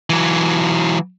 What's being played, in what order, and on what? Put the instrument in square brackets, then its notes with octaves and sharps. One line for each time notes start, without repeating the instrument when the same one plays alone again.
[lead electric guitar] E3 F#3